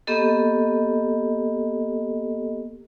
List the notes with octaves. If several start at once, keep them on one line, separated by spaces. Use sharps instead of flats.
A#3 B3 G4 A4 D#5